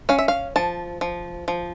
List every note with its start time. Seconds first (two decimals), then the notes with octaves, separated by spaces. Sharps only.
0.09 C#4 F5
0.19 E5
0.28 F5
0.56 F3 A5
1.01 F3
1.48 F3